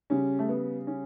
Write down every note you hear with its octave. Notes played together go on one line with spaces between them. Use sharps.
C#3 G3 C#4
A3
B3
C#4